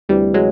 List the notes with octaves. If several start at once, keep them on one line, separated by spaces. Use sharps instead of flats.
D2 C3 E3 G3
F#3 G#3